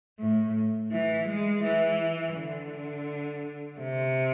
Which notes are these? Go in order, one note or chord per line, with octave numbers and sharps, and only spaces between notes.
A2
E3
G#3
E3
D3
C3